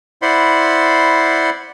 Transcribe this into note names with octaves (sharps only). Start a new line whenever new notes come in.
E4 C5 D5 F#5 B5 C6